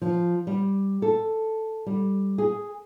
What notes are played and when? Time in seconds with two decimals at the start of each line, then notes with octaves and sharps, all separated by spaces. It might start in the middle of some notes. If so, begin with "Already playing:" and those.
0.02 F3
0.47 G3
1.02 A4
1.86 G3
2.38 G#4